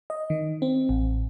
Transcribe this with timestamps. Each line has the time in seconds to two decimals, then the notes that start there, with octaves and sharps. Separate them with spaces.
0.10 D#5
0.30 D#3
0.62 C4
0.89 A1